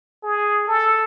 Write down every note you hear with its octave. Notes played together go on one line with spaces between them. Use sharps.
G#4
A4